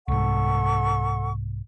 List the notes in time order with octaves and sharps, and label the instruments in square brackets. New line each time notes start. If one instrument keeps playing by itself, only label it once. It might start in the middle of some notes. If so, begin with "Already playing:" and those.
[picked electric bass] C2 G#2 [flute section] A4 F#5 C#6